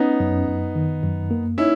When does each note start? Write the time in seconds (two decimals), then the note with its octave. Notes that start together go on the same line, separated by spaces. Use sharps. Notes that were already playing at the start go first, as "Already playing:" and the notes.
Already playing: B3 C#4 D#4
0.20 F#2
0.48 F#2
0.75 D#3
1.03 F#2
1.31 A#3
1.58 C#4 D#4 E4